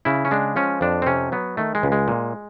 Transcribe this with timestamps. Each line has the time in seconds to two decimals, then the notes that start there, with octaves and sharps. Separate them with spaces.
0.05 C#3 E4
0.25 C#4
0.31 G#3 D4
0.56 F3 C#4
0.81 F2 D4
1.02 C4
1.06 C3 C#4
1.32 F#3 B3
1.57 D#3 A3
1.75 G#3
1.83 C#2
1.92 G#3
2.08 A#2